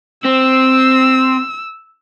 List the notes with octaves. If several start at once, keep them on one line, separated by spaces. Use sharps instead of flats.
C4 E6